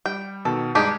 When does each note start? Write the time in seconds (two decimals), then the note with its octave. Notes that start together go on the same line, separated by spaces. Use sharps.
0.06 G3 G5
0.45 B2 D#3 A4
0.75 G2 G#3 D4 D#4 G4 G#4